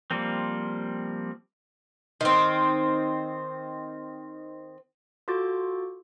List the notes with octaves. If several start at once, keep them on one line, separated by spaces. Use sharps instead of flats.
F3 G3 A#3 C4
D#3 C4
F4 F#4 A4 D6 G6 A6